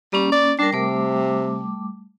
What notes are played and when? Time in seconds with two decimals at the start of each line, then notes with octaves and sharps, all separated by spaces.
0.13 G3 A#3 C#4
0.32 D5
0.59 G3 D4 A#4
0.73 C3 G3 A3 D6